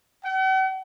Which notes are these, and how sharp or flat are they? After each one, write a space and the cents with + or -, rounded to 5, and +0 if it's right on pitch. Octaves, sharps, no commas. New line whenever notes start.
F#5 +45